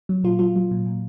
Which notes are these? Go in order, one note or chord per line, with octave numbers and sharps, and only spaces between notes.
F#3
A#2 F4
F#3 F4
F#3
A#2
A#2